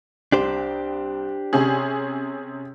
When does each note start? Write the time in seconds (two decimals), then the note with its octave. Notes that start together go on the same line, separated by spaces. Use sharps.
0.32 C2 D4 G4 C5
1.53 C3 C#4 G#4